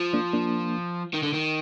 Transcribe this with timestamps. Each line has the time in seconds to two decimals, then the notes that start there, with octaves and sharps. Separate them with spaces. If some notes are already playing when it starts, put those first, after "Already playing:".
Already playing: F3
0.13 A#3 D4
0.33 A#3 D4
1.14 D#3
1.23 D3
1.33 D#3